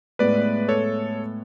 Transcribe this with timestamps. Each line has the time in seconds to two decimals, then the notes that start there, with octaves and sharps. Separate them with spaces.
0.19 A2 G#3 B3 B4 D5
0.68 A4 C#5